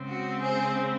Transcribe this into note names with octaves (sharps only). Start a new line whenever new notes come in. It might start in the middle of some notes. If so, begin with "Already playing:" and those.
Already playing: C#3 G#3 C4
F#4
G#4 C5